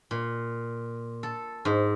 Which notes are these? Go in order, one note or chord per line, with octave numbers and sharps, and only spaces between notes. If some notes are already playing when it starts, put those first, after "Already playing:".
A#2
A4
G#2